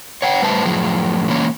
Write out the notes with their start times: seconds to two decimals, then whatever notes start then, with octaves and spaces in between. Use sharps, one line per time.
0.22 C#5 F#5 G5
0.42 A2 G3 B4 C5 E5 A5
0.66 F#2 A2 F3 G#4
1.28 C#3 E3 A#3 C#4